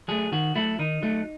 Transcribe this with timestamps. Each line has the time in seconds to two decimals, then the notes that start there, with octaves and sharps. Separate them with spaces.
0.08 F#3 A3 G#4
0.32 D#3 F#4
0.56 F#3 A3 E4
0.79 D#3 D#4
1.03 F#3 A3